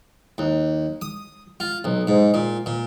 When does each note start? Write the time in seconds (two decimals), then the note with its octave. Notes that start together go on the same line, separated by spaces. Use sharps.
0.38 D#2
1.02 D#6
1.60 F4
1.84 B1
2.07 G#2
2.34 A#2
2.66 A#2